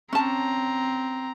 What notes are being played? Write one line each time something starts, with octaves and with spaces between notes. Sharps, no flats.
C4 C#4 A5 A#5